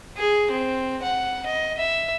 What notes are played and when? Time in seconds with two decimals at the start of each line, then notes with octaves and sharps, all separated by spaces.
0.17 G#4
0.51 C4
1.03 F#5
1.46 D#5
1.78 E5